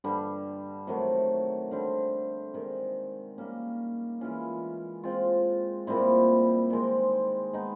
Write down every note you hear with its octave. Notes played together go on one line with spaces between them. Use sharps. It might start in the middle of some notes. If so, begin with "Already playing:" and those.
G2 D3 G3
C3 D#3 F#3 A3
D3 G3 C4
C3 D#3 G#3
D#3 G3 A#3 C#4
E3 G#3 C#4 F4
G#3 C4 F4
A#2 G3 C4 E4
D#3 G#3 C4
G#3 B3 D#4